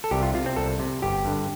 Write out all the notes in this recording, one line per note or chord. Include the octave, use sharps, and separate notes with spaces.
A4
C2 G4
F4
C3 F4
C4
C2 A4
C3
G1 G4
G2 D3